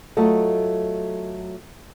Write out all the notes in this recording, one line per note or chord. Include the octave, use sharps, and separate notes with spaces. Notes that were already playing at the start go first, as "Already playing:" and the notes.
F#3 A3 F4 A4 D#5